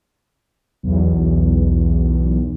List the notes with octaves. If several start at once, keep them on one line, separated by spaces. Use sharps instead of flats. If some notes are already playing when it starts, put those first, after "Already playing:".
B1 E2